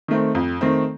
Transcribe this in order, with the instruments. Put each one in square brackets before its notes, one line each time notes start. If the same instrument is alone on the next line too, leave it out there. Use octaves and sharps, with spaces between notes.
[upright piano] D#3 A3 C4
F2
D#3 A3 C4